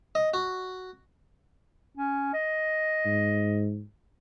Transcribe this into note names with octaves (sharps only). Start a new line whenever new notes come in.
D#5
F#4
C#4
D#5
G#2